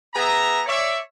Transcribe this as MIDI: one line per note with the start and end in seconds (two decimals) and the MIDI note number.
0.14 0.61 59
0.14 0.61 68
0.14 0.61 76
0.14 0.61 82
0.66 0.98 73
0.66 0.98 74
0.66 0.98 76